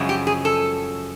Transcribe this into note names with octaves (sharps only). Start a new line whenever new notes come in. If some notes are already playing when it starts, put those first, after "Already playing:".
Already playing: F#2 C#3 F3 G#3
G4
G#4
A4